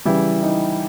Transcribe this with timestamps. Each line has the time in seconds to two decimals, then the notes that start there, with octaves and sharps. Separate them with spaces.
0.05 C#3 E3 G3 E4
0.43 D#4